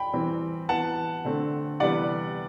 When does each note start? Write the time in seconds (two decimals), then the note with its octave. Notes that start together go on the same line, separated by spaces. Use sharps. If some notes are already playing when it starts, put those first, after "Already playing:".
Already playing: G5 B5
0.13 E3 G3 C4
0.69 E3 B3 F#5 A5
1.25 D3 A3 C4
1.80 C3 E3 G3 B3 D5 F#5